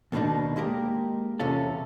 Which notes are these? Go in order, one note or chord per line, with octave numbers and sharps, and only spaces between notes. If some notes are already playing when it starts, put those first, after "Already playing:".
D#2 B2 D#3 A#3 D4 D#4
G#3 A#3 G4 A#4
E2 C3 C#4 F4 A4